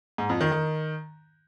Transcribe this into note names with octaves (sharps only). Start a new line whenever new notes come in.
G#2
F2
D#3
D#3